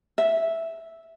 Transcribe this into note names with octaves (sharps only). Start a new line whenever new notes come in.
E5